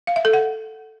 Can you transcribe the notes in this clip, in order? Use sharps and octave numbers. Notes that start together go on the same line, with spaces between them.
F5
E5
A4
F#5